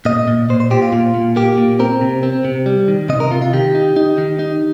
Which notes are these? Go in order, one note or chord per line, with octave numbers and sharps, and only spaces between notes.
A#2 D#5
A#2
A#2 C5
C5
A#2 G4
F4
A#2
A#2
A#3 G4
A#2
C4 A#4
C3
C4
C3
G3
D#3
C3 D#5
A#4
C3 F4
F4
D#3 G4
D#4
D#4
D#3
D#4